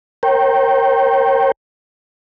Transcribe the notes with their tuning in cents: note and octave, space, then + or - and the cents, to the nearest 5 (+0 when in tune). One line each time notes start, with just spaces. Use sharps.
A#4 +0 C#5 -45 G5 -15